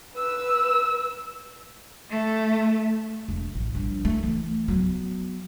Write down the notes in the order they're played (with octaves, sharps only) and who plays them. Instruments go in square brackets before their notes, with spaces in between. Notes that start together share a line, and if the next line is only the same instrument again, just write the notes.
[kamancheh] B4 E6
[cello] A3
[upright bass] E1
A1
A#1 G3
A3
E3
F#3 B3